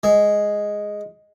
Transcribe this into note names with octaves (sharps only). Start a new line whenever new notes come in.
G#3